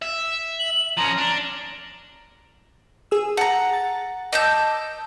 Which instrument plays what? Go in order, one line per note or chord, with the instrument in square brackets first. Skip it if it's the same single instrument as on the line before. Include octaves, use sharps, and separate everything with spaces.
[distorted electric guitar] E5
[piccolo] F#7
[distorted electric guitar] F3 C#4 [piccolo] A#5
[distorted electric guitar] D4
[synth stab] G#4 E6
[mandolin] F#5 A#5 [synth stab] A5
[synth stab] A6
[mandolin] D#5 A5 G6 [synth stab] D6 E6